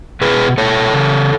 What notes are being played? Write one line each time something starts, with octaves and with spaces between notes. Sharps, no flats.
B2 G#4 B4
B2 A4 C#5
C#3